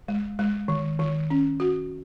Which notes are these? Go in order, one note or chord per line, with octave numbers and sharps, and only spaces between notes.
G#3
G#3
D#3
D#3
C#4
F#4